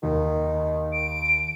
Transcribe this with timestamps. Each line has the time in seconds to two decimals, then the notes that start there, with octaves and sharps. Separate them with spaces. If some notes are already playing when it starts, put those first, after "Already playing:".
0.03 D#2 D#3
0.92 D7